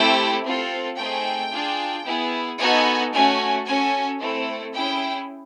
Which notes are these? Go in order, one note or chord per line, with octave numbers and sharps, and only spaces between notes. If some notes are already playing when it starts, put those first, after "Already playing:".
Already playing: A3 C4 E4 G4 G5
C4 F4 A4
A3 C4 D#4 G#4 G5
D4 F4 G#4
B3 E4 G#4
B3 D#4 F#4 A4 G#5
A3 C#4 F#4 G#5
C#4 F#4 A4 G#5
A3 C4 E4 A4
C#4 E4 G#4 G5